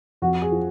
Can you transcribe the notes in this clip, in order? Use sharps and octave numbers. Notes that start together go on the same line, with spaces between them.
F2 F#4
G#4
F3